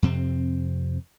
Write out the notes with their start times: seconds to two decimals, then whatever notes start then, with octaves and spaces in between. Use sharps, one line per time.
0.02 F2 C3 C4